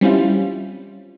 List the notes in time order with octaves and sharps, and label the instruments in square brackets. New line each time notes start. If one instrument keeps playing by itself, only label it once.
[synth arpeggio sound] G3 C4 C#4 E4 F4